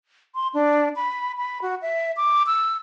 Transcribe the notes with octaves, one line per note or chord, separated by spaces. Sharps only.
C6
D4
B5
B5
F#4
E5
D6
E6